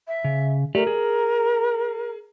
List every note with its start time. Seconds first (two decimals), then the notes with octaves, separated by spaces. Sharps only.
0.07 E5
0.24 C#3
0.75 A3 G4 A#4 D5
0.87 G#4